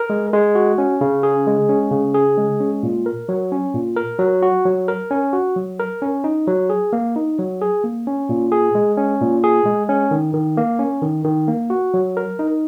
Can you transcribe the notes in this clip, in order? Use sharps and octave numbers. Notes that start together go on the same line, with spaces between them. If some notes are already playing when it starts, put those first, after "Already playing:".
Already playing: A#4
G#3
G#3
F#4
C#4
C#3
G#4
G#3
C#4
C#3
G#4
G#3
C#4
A#2
A#4
F#3
C#4
A#2
A#4
F#3
F#4
F#3
A#4
C#4
F#4
F#3
A#4
C#4
D#4
F#3
G#4
A#3
D#4
F#3
G#4
A#3
C#4
A#2
G#4
G#3
C#4
A#2
G#4
G#3
C#4
D#3
D#3
A#3
C#4
D#3
D#3
A#3
F#4
F#3
A#4
D#4